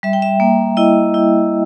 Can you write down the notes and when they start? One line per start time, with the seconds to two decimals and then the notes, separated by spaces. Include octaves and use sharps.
0.03 G3 E5
0.13 G5
0.22 E5
0.40 A#3
0.77 E4 D#5
1.14 E4